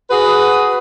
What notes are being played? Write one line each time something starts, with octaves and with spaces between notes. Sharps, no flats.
F#4 G#4 B4